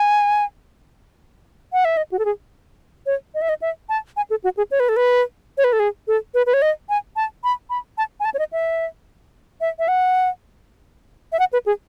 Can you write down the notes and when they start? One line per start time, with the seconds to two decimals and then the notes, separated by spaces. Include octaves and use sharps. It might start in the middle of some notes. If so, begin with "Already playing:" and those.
Already playing: G#5
1.73 F#5
1.85 E5
1.97 D#5
2.12 F#4
2.19 A4
2.25 G#4
3.06 C#5
3.35 D#5
3.42 E5
3.49 D#5
3.62 E5
3.89 A5
4.17 G#5
4.30 A4
4.44 F#4
4.57 G#4
4.71 C#5
4.80 B4
4.89 A4
4.96 B4
5.58 C#5
5.64 B4
5.73 A4
5.79 G#4
6.07 A4
6.34 B4
6.46 B4
6.54 C#5
6.62 D#5
6.89 G#5
7.16 A5
7.44 B5
7.70 B5
7.98 A5
8.20 G#5
8.25 A5
8.34 C#5
8.39 D#5
8.53 E5
9.61 E5
9.79 E5
9.88 F#5
11.32 E5
11.39 F#5
11.53 B4
11.66 G#4